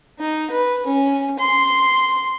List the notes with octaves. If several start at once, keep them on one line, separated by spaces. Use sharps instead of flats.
D#4
B4
C#4
C6